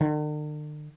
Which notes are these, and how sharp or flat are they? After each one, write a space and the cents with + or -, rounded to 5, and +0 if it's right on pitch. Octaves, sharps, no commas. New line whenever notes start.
D3 +45